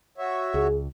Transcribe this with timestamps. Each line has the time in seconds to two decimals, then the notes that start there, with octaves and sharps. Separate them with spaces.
0.18 F#4 C#5 E5
0.54 C#2 G#4